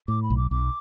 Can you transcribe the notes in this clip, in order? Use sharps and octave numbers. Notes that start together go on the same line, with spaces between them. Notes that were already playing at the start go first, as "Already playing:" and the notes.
A2 D6
B5
B1
D6
B1 D6